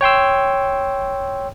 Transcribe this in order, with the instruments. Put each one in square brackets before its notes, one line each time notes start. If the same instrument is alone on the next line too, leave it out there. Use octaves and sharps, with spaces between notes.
[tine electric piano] C#5 G5 C6 E6